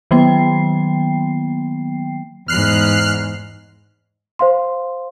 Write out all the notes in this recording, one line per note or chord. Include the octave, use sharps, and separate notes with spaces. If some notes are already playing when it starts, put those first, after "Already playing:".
D#3 F#3 A#3 B3 G5 C7
E2 G#2 F6 F#6 C7
C5 F5 C6